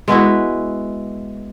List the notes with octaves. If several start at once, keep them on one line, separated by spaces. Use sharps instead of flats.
G#3 B3 E4 F#4